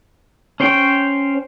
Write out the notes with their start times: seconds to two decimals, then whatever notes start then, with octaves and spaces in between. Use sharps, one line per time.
0.60 C#4 C5 C#5 G5